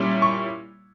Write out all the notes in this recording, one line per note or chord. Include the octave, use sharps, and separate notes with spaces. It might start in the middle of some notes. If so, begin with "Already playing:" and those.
Already playing: A#2 G3 C#4 E4
C#6